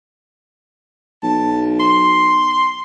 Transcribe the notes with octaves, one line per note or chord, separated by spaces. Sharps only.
B1 A5
C6